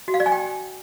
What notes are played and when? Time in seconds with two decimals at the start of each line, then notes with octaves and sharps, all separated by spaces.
0.08 F#4
0.14 F5
0.20 D5
0.26 G#5
0.32 G5